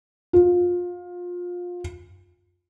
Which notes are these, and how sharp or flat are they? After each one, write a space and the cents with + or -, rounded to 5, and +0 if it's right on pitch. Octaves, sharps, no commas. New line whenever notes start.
F4 +25